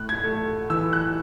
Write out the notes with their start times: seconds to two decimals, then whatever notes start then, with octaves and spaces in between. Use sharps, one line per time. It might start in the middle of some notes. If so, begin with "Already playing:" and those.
Already playing: A2 F#6
0.09 G#6
0.24 A3
0.69 E3 E6
0.93 F#6